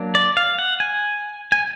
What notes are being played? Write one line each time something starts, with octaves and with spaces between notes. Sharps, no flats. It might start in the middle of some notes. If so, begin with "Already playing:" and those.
Already playing: F#3 A#3 D4
D5
F5
F#5
G#5
G#5